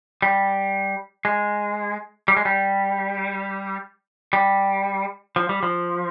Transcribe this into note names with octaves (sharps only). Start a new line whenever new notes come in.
G3
G#3
G3
G#3
G3
G3
F3
G3
F3